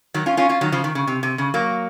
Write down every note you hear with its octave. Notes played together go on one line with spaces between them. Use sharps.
D#3 F#3
C#4 F4
C#4 F4
C#4 F4
D#3 F#3
C#3 F3
D#3
C#3
C3
C3
C#3
F#3 A#3